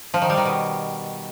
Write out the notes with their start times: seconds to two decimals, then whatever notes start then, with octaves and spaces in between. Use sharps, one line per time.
0.14 F3
0.22 D#3
0.30 G3
0.37 D#3
0.45 B2